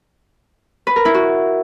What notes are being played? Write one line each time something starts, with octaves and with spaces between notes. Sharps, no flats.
B4
A#4
E4
F#4